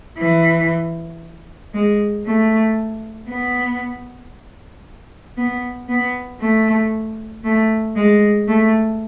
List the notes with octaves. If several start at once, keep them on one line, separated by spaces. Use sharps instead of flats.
E3
G#3
A3
B3
B3
B3
A3
A3
G#3
A3